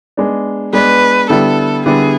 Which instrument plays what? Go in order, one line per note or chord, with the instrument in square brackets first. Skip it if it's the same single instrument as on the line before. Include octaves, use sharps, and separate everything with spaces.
[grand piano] G#3 B3 D4
[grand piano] G#3 B3 D4 [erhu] B4
[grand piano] D3 G3 B3 E4 [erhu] A4
[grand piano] D3 G3 B3 E4 [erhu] G#4